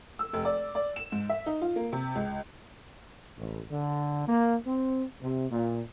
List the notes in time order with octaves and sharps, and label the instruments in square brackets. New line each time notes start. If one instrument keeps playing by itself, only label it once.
[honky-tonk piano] E6
F1
D5
D5
E7
G#2
E5
D#4
F4
A#3
C3
C#2
[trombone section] A1
D3
A#3
C4
C3
A#2